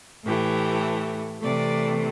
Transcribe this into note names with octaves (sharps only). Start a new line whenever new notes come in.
A2 E3 A3 G4
C3 E3 A3 D5